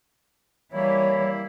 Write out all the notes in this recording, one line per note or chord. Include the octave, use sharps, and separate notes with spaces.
E3 G3 A#3 E4 C#5